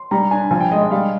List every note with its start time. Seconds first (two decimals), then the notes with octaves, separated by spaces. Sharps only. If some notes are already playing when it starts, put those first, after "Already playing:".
Already playing: C6
0.11 G3 A#5
0.31 D4 G#5
0.51 F3 G#5
0.61 G5
0.72 G#3 D#5
0.82 D#5
0.91 G3 F5